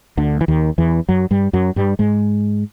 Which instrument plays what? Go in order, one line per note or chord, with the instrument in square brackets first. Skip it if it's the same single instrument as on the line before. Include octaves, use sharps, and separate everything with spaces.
[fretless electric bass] D2 D3
E3
D#2 D#3
E2 E3
F#2 F#3
G2 G3
F#2 F#3
G2 G3
G#2 G#3